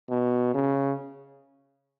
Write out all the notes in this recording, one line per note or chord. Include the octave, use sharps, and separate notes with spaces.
B2
C#3